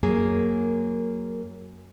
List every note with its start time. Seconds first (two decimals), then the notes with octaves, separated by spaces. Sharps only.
0.03 F#2 A#3 G#4